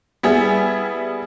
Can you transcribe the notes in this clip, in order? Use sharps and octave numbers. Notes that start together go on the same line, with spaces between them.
G3 B3 E4 G#4